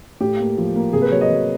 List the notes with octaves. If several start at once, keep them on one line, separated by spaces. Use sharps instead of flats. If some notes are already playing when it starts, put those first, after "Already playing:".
A2 G4
A#3
F3
A#3
C3 G#4
B4
F#3 C#5
D#5
F#3